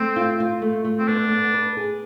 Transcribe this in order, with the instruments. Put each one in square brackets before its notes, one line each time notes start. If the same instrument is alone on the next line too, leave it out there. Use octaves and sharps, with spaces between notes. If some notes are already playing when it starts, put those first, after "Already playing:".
Already playing: [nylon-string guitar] A3 [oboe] C4
[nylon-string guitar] F4
F4
A3
A3
[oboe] C4
[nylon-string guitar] B3 [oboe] D4
[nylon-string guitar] B3
B4
G#4